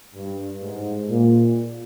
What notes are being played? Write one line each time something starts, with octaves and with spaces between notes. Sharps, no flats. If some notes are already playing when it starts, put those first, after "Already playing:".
G2
G#2
A#2